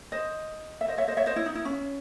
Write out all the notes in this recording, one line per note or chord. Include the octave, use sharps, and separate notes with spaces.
C5 D#5
E5
C5 D#5
C#5 E5
C5 D#5
C#5 E5
C5 D#5
E4
D#4
E4
C#4